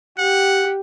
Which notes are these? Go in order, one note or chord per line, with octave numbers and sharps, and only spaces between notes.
G4 F#5